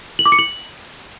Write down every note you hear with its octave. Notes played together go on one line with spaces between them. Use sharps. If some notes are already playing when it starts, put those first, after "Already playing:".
F#7
D6
C#7
F#7